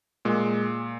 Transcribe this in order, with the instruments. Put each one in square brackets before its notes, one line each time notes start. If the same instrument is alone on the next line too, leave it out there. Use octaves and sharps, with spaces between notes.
[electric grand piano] A#2 G#3